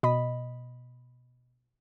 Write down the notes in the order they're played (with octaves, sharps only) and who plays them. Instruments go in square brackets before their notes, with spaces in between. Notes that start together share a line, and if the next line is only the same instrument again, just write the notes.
[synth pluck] B2 D#5 B5